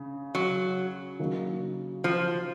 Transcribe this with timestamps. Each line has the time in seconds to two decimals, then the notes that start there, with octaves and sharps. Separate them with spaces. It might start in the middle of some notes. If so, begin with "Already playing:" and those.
Already playing: C#3
0.35 F#3
1.19 C#3 F#3 A#3 D#4
2.04 F3